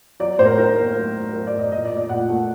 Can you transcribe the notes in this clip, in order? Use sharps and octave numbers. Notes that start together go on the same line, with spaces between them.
F#3 D5
A2 C5
A#4
D#4 A#4
A#3
F#3
F#3
F#3 A#4
D5
A2
D#5
A#2 D#5
D5
A3
D5
A#2 F#5
A3